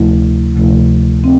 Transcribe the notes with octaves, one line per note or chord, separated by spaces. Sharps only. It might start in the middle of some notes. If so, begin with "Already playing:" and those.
Already playing: D2 C3 F3 A3 E4
D2 C3 F3 A3 E4
C4